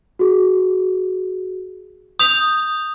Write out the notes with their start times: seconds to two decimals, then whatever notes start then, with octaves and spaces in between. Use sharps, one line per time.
0.19 F#4 G#4
2.19 D#6 G6 F7